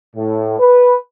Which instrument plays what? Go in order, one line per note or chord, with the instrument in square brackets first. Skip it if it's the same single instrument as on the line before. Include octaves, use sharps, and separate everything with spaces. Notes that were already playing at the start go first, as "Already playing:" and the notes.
[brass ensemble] A2
B4